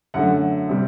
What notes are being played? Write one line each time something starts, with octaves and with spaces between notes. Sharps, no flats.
F#2 D3 A3 F#5
C3 G3 C4